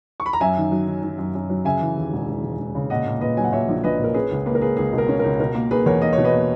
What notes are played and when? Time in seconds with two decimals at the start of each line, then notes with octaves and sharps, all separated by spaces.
0.20 C#6
0.26 B5
0.33 A#5
0.41 F#2 E5 G#5
0.57 D#3
0.72 F#3
0.87 D#3
1.03 F#3
1.19 F#2
1.35 F#2
1.49 F#3
1.65 C#3 E5 G#5
1.81 E3
1.97 D#2
2.13 E1
2.28 E1
2.43 E1
2.59 E1
2.75 C#3
2.90 A#2 D#5 F#5
3.06 A#2
3.21 A#2 B4 D#5
3.37 F#3 G#5
3.44 F#5
3.52 A#2 C#5 E5
3.68 A#1
3.84 A#1 B4 D#5
3.99 A#2
4.04 A#4
4.14 C#4 G#4 B4
4.31 C#2
4.46 A#3 B4
4.55 A#4
4.62 A#3 G#4 B4
4.77 C#2 G#4
4.93 B2
4.98 A#4
5.09 C#4
5.19 C#2 A#4
5.39 B2 A#4
5.55 A#3
5.71 A#3 G#4 B4
5.86 E2 A#4 C#5
6.01 A#3 D#5
6.13 B2 C#5
6.24 B4 D#5
6.33 A#3